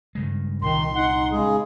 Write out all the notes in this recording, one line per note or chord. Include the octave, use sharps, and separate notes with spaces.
G2 C#3 G#3
C2 A#2 D#3 C6
D#4 F#5
C#3 G#3 G#4